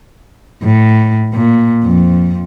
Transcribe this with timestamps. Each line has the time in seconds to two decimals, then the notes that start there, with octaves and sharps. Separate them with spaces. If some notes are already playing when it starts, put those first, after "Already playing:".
0.63 A2
1.34 A#2
1.84 F2